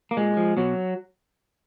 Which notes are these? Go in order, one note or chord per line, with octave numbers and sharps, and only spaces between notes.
A#3
A#2 G#3
F3
B2 F#3